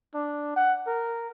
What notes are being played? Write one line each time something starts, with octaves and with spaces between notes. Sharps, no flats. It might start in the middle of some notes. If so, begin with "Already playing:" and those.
D4
F#5
A#4